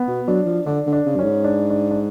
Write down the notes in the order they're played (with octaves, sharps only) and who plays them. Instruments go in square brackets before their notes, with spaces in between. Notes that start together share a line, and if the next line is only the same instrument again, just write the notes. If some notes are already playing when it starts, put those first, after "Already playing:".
Already playing: [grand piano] B3
[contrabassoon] B2
[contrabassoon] F#3 [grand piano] D4
[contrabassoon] F3
[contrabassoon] D3 [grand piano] D4
[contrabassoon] D3
[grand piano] D4
[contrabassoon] C#3
[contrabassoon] F#2 [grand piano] C#4
[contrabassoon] G#2
[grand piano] D4
D4
D4